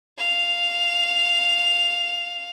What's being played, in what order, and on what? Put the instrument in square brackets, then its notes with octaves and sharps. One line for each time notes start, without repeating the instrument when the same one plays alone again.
[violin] F5 F7